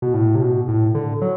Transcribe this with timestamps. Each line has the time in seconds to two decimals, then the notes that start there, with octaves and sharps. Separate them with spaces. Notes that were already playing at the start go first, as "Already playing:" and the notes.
0.02 B2
0.14 A2
0.35 C3
0.41 B2
0.68 A2
0.95 D3
1.22 F#3